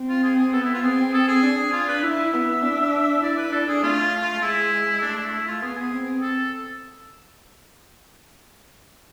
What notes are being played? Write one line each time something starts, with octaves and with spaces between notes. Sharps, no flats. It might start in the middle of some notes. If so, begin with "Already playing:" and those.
Already playing: C4
F4
G#4
G#4
B3 A4
E4
F4
C4 G#4
A4
G#4
D4
D4 F4
B4
E4 E5
B3
D4
E4 D5
B4
D4 A4
G#4
A3 F4
G#3 E4
A3 D4
E4
E4
F4
B3 G#4
G#4
C4
A4